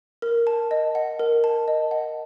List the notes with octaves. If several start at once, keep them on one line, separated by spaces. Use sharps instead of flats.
A#4
A5
D#5
F#5
A#4
A5
D#5
F#5